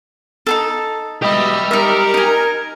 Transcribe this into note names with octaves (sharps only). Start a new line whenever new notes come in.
D#4 G#4 A4
B2 G4 D#5 E5 B5
D#4 A#4 E5
D#4 G#5